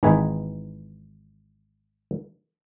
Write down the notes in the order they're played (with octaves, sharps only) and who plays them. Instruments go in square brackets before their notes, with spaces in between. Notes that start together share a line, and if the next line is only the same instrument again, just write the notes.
[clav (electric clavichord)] G#1 E3 D#4 G#4 B4 G#5